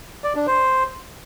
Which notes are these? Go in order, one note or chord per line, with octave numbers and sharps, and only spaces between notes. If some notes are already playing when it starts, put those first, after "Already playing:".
D5
D4
C5